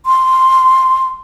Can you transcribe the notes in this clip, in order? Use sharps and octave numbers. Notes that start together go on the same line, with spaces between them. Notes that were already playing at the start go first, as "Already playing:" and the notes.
C6